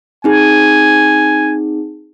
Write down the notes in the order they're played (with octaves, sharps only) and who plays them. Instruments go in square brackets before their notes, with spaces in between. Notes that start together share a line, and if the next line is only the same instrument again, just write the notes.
[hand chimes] C4 D#4 G#4 [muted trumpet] G#5